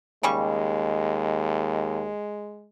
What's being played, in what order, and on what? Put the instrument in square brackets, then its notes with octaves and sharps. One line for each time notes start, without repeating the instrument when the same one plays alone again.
[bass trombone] D#2 [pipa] C#3 G3 C#6 [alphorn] G#3